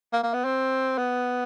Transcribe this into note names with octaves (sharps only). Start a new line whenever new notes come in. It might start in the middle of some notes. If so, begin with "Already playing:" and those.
A#3
A#3
B3
C4
B3